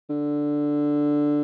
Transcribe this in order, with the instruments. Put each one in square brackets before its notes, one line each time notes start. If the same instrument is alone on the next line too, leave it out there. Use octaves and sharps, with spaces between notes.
[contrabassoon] D3